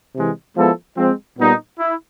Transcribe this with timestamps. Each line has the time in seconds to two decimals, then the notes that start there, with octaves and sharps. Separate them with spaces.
0.15 C3 E3 G#3
0.56 F3 G#3 B3 E4 A4
0.97 F3 G#3 C4
1.39 A#2 G3 B3 D#4
1.79 E4